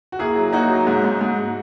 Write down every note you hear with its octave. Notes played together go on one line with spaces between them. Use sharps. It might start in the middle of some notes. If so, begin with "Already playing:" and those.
F#4
A#3 E4 G#4
F#3
A#3 D#4 F#4
F#3
G#2
G#2
G#2